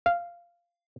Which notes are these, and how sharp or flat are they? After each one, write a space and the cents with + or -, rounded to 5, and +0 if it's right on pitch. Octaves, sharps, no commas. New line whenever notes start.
F5 -10